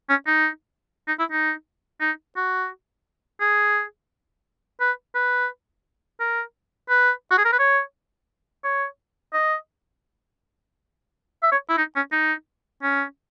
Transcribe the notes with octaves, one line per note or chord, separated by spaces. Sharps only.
C#4
D#4
D#4
E4
D#4
D#4
F#4
G#4
B4
B4
A#4
B4
F#4
G#4
A#4
B4
C#5
C#5
D#5
E5
C#5
E4
D#4
C#4
D#4
C#4